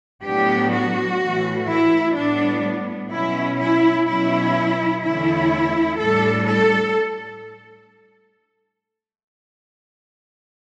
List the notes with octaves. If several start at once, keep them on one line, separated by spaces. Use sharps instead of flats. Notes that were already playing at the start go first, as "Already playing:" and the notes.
A2 F#3 B3 D4 G4
F#4
A2 E3 A3
E4
A2 G3 B3 D4
B2 F#3 C#4 E4
E4
B2 F#3 C#4 E4
E2 D3 A3 C#4 E4
A2 G3 D4 A4
A4